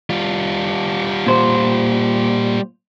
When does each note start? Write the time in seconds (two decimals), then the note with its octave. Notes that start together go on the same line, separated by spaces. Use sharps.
0.10 G3 F4
1.27 A#2 C5